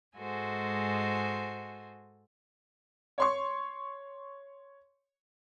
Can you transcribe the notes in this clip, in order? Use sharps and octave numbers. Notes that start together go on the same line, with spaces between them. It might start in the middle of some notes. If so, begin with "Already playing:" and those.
G#2 G#3 F#4 A4 C5 G#5
C#5 C6 C#6